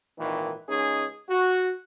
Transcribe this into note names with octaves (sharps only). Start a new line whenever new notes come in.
G#1 A#2 D#3 E3
C#2 C#4 D#4 G#4
F#4